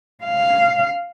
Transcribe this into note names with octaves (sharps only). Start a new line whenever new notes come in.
F5